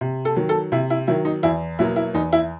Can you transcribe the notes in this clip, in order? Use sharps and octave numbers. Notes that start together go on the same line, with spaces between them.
C3
A4
D#3 F#3
A4
C3 E4
E4
D#3 F#3 E4
D#4
E2 E4
B2 F#3 A#3 E4
E4
E2 D#4
E4